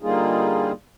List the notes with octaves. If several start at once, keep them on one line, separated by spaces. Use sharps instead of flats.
D3 G3 A#3 D#4 F4 G#4